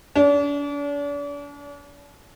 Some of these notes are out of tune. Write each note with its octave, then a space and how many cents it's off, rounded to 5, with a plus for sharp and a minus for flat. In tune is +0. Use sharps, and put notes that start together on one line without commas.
D4 -40